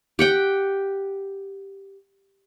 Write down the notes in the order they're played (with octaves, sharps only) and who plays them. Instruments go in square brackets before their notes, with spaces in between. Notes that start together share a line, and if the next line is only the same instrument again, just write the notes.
[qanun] G4 F#5 G5